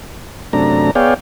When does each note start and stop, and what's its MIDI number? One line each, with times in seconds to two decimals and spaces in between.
0.53 0.91 42
0.53 0.91 48
0.53 0.91 57
0.53 0.91 62
0.53 0.91 82
0.95 1.14 59
0.95 1.14 68
0.95 1.14 73
0.95 1.14 74
0.95 1.14 77
0.95 1.14 79